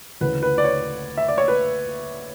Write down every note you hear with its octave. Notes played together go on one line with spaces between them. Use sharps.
D2 C#3 E3 B4
B4
D5
C#5
E5
D5
C#5
B4